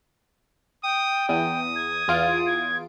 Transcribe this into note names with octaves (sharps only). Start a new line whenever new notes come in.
G5 D#6
E2 D#6
G#6
E2 F4 D7
G#6